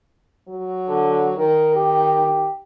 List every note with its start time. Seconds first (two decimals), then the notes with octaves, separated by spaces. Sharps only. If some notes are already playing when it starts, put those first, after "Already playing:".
0.48 F#3
0.88 D3
1.38 D#3 A#4
1.76 G4